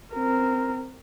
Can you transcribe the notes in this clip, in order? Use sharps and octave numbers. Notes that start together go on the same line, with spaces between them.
C4 A#4